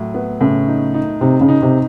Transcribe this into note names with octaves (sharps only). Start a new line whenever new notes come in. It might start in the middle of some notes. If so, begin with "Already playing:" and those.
Already playing: A2 F#3
B3
A2 C#3
D#4
D#4
C3 D#4
C#3
D#4
C3